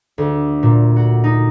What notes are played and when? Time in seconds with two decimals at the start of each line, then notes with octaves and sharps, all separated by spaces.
0.18 D2
0.63 A#2
0.96 F#4
1.24 D#4